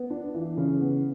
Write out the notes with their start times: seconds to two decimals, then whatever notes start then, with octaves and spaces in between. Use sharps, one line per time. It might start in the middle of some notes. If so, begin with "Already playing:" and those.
Already playing: B3
0.10 D4
0.34 E3
0.57 C#3
0.81 B3